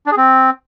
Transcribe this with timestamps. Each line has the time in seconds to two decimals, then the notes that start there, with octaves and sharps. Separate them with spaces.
0.06 D4
0.12 G#4
0.17 C4